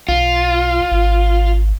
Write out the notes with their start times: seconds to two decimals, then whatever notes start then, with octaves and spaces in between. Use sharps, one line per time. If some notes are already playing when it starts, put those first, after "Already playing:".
0.08 B1 F4
0.92 G#1